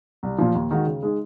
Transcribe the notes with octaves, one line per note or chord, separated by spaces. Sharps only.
C2
A#2 F3
D#2
D#3 G#3 D#4 F#4
C#3
G#3 D#4 G#4